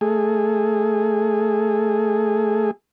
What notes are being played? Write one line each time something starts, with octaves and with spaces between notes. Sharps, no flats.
A3 G#4